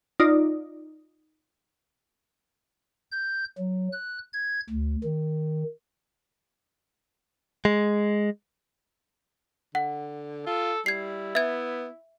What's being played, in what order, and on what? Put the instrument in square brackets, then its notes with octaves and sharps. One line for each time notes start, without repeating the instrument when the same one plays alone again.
[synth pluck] D#4 F4 D5
[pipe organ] G6
F#3
F#6
G#6
D2
D#3
[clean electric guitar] G#3
[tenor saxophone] D3 [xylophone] F#5
[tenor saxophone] F4 [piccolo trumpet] A4
[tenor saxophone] G3 [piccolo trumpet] E4 [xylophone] G#6 C7
[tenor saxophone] B3 [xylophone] E5 G#6